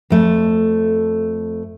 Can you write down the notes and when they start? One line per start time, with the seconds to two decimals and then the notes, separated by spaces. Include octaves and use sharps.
0.10 F2 A3